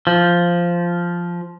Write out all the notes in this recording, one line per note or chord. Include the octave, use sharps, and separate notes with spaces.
F3